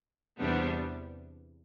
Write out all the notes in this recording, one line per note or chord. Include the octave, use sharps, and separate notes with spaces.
E2 C3 G3 B3 D4